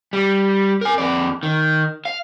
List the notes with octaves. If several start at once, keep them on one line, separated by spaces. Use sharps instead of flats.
G3
A#4 G#5
F2 D5
D#3
F5